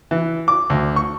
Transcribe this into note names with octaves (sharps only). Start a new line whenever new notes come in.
E3
D6
D2
C#6